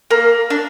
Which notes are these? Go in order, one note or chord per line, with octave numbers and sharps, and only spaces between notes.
A#3
D4